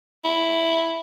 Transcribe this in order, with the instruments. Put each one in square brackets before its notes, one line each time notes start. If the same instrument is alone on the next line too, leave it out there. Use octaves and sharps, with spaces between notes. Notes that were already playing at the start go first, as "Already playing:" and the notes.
[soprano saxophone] E4